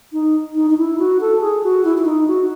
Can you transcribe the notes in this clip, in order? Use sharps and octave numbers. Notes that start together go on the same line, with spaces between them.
D#4
D#4
D#4
E4
F#4
A4
G#4
F#4
E4
E4
D#4
F#4